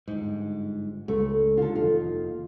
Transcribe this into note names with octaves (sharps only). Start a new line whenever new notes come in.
G1 G#2
C#2 A3
D3 F4 A4
F1 D#2 F4